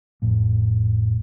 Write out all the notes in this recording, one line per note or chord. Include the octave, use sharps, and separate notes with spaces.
A1 F2 A2